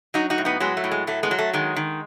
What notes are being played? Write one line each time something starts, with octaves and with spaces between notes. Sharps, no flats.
F#3 D#4 F#4
D#4 F#4
A2
B3 D#4
F#3 G#3 B3
A3
A2
G#3
F#3 A3
G#3 B3
F#3
A3
D#3 G#3
D#3